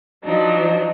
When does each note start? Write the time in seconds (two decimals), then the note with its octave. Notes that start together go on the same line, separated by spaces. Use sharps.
0.24 F3 F#3 D4 D#4